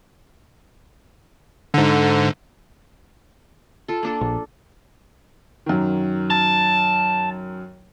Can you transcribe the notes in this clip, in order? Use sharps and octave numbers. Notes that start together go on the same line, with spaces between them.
G#2 D3
F4 A4
A#3 D4 A4
A#1
F#2 D#3
A5